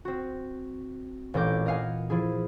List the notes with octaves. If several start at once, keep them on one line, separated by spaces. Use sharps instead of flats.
C4 F#4
A1 A#2 G4 A#4 D6 G6
A#4 D#5 F5 F#5 G#5
F3 E4 G#4